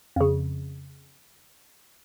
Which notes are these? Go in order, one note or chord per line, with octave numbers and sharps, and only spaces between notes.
F2 C#3